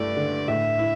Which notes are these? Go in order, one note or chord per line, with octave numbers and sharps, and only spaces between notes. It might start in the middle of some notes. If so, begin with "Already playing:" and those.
Already playing: G2 A3 E4 D5
D3
A2 E5
E4